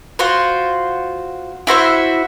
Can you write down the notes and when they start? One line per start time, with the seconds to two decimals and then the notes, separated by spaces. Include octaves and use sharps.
0.19 F4 F#4 C5
1.67 E4 F#4 C5 E5